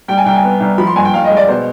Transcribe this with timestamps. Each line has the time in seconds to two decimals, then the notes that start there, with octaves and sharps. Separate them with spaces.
0.08 G3 G5
0.17 G#5
0.26 C2 G5
0.35 G#5
0.43 B3
0.60 C2
0.78 F3 B5
0.87 C6
0.96 G2 G#5
1.05 G5
1.13 G2 F5
1.25 D#5
1.31 G#3
1.37 D5
1.48 B2 C5